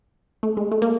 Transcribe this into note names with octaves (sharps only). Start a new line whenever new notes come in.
A3
G#3
A3
A#3